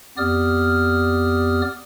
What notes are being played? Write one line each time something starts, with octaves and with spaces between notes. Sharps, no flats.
F2 B3 G4 D5 D#6 F6